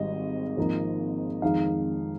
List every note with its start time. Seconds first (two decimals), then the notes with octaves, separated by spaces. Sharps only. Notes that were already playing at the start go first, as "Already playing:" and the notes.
Already playing: G#1 G#2 G3 D#5
0.57 G#1 G#2 F3 A#3 D#4
1.42 F2 D#3 G#3 D#4 F5